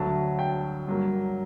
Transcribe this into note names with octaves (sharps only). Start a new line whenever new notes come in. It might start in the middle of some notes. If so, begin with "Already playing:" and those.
Already playing: D2 D3 F#3 A5
G5
G2 F#3 A#3